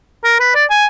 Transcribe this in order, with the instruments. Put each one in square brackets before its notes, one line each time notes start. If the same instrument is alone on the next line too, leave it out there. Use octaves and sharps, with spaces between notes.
[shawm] A#4
B4
D5
G#5